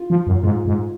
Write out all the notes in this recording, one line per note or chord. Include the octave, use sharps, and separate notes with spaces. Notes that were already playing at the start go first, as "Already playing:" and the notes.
Already playing: F4
F3
F#2
G#2 F4
G#2